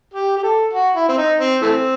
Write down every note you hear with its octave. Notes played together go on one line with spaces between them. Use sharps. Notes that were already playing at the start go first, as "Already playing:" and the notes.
G4
G4
A4
F#4
E4
C4
D#4
C4
E3 A3 C4